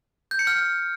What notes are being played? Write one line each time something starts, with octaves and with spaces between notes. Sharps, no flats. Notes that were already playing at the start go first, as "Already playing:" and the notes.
G6
C#7
F6